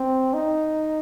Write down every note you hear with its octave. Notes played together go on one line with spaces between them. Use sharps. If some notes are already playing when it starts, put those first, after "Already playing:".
Already playing: C4
D#4